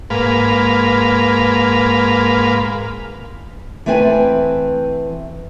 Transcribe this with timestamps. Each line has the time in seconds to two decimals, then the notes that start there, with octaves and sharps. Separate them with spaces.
0.10 G#2 A#3 B4 F5
3.86 E3 A3 C4 B4 C5 G#5